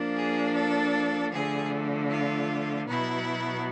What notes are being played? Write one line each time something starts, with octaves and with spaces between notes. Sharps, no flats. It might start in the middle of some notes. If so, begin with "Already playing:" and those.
Already playing: F3 A#3 D4
G#4
A4
D3 F3 A3 G#4
F4
B2 F#3 B3 E4